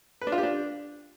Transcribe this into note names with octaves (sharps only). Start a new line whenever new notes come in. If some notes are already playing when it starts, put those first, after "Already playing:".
B4
D4
F4
G4
D4